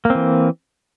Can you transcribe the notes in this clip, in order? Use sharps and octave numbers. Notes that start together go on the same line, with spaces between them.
E3 A#3 C4